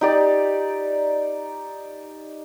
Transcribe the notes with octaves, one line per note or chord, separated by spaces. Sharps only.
D#4 G4 D5